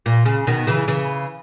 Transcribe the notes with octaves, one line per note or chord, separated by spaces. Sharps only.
A#2
C#3
B2 D#3
C#3 E3
C#3 E3